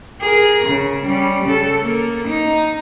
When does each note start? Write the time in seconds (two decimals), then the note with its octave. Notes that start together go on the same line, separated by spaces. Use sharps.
0.21 G#4 A#4
0.65 C#3
1.05 G3 C#4
1.45 C#3 A4
1.81 A#3
2.28 D#4